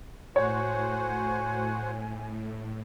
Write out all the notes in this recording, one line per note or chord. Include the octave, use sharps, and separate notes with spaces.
A2 F#4 C5 C#5 F#5 G#5